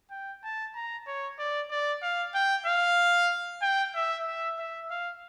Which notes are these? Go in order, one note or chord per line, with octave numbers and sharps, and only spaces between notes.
G5
A5
A#5
C#5
D5
D5
F5
G5
F5
G5
E5
E5
E5
F5